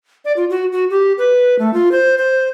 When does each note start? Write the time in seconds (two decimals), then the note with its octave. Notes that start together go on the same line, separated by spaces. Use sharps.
0.25 D5
0.37 F4
0.50 F#4
0.72 F#4
0.90 G4
1.18 B4
1.59 A3
1.74 F4
1.92 C5
2.18 C5